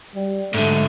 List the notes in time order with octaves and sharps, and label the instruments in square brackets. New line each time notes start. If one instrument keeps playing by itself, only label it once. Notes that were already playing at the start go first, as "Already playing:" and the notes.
[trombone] G3
[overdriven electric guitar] G#2 D3 [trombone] A3